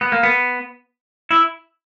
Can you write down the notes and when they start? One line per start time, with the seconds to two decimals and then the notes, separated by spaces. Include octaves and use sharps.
0.01 B3
0.12 A#3
0.23 B3
1.31 E4